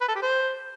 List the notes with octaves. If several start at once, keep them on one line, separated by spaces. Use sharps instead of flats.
B4
A4
G4
C5